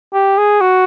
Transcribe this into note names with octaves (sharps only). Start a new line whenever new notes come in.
G4
G#4
F#4